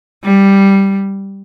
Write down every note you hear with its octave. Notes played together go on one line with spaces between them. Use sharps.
G3